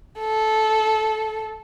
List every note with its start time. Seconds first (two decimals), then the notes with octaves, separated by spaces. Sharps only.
0.20 A4